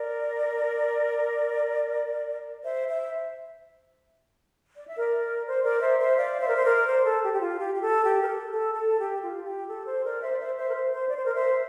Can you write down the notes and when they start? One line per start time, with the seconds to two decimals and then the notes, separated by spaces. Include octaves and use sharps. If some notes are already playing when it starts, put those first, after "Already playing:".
Already playing: A#4 D5
2.64 C5 E5
2.88 C5 E5
4.76 D5
4.87 E5
4.97 A#4 D5
5.47 C5
5.64 A#4 D5
5.82 C5 E5
5.99 C5 E5
6.17 D5 F5
6.40 C5 E5
6.48 A#4
6.56 C5
6.64 A#4 D5
6.88 C5
7.05 A4
7.22 G4
7.33 G4
7.40 F4
7.58 G4
7.74 G4
7.81 A4
8.05 G4
8.22 A#4
8.28 A4
8.51 A4
8.75 A4
8.98 G4
9.22 F4
9.45 G4
9.68 A4
9.87 C5
10.03 A#4 D5
10.22 C5 E5
10.31 D5
10.39 C5 E5
10.56 C5 E5
10.68 A#4
10.74 C5
10.92 C5
11.10 D5
11.17 C5
11.25 A#4 D5
11.33 C5 E5